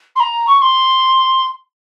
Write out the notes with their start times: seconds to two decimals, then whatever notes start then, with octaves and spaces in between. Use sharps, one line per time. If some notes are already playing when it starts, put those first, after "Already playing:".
0.16 C6
0.20 A#5
0.47 C#6
0.58 C#6
0.62 C6